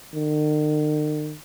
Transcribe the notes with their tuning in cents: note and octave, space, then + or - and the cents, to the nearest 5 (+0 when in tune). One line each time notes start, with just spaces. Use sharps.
D#3 -45